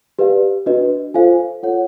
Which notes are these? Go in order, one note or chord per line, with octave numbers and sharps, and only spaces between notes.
G4 B4 D5 F5
D4 F#4 B4 D#5
F4 A4 C5 F5 G#5
F4 A4 C#5 F#5